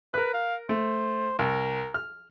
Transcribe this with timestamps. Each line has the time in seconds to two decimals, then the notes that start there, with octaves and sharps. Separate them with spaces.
0.14 A#4 B4 F#6
0.34 F5
0.69 A3 C5
1.39 C2 A#4
1.94 F6